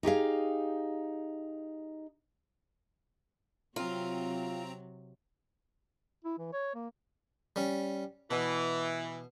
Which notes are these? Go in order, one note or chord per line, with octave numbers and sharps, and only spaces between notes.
D#4 G4 G#4 F5
C3 F#3 C4 F4 A#5
E4
E3
C#5
A#3
G3 C#4
B2 E3